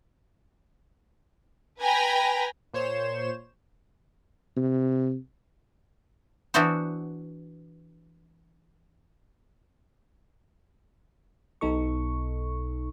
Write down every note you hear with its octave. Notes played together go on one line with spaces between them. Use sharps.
B4 G5 G#5 A#5 B5
A#2 C5 C#5 E7
C3
E3 B3 D4 E4 F#4 C5
B1 B2 D#4 A4 C#6